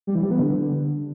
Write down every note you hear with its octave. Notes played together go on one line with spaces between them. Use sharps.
G3
E3
G3
B3
D3